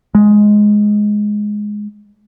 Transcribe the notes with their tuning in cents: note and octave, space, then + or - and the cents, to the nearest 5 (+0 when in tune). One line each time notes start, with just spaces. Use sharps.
G#3 +5